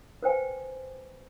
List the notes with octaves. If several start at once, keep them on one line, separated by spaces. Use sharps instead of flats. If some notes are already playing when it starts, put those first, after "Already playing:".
B4 C5 G5 G#5